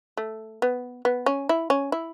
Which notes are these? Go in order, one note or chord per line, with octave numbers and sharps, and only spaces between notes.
A3
B3
B3
C#4
E4
C#4
E4